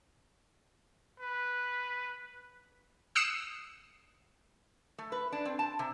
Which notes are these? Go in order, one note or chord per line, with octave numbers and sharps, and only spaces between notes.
B4
D#6 E6 F#6 C7 C#7 E7
A3
B4
D4
C4
A5
C3